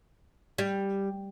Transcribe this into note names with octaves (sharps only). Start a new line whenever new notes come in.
G3